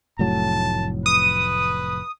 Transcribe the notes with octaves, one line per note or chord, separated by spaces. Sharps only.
F1 A2 F#3 A5
B4 D#6